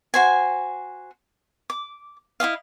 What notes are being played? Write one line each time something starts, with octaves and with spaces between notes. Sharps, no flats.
F#4 C5 G#5
D6
E4 F4 D#5 F5